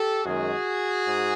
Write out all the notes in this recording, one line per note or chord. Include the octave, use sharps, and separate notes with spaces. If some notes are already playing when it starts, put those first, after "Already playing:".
Already playing: G4 A4
F#2 D#3 G#3 F#4 G#4
G#2